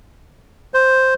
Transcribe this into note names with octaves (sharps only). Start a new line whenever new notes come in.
C5